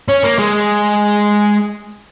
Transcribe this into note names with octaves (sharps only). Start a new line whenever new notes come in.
C#4
A#3
G#3